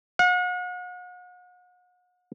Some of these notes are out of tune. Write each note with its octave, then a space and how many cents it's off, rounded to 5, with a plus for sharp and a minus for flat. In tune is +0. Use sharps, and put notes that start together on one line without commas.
F#5 -40